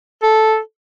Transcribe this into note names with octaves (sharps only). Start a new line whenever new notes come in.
A4